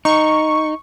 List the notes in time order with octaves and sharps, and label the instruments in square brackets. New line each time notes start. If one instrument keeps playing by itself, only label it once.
[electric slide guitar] D#4 [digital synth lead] C#6